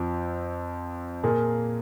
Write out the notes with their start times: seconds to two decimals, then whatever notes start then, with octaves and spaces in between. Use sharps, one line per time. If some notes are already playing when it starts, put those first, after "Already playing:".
Already playing: F2 F3 C4
1.23 A#2 A#3 G#4